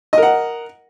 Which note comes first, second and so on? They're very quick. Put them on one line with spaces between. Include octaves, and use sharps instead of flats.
D#5 A#4 F#5